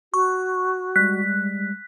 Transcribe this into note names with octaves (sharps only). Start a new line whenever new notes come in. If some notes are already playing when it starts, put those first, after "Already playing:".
F#4 C#6
G3 G#3 F#6 B6